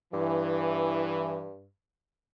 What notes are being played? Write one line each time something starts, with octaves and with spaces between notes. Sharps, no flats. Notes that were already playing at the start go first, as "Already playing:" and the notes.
G2 E3